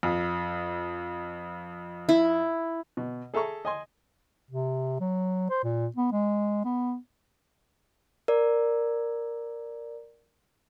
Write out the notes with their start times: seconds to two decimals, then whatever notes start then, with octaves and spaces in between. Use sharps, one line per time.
0.03 F2
2.09 E4
2.97 B2
3.34 G#4 A4 E5 A#5 C#6
3.65 D#5 G#5 C6
4.51 C3
5.01 F#3
5.50 C5
5.64 A#2
5.96 B3
6.12 G#3
6.65 B3
8.28 A#4 D5